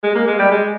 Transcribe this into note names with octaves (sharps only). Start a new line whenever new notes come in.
G#3
A#3
G#3
G3
G#3